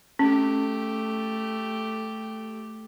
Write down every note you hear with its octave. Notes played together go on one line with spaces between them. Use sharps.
A3 C#4 G4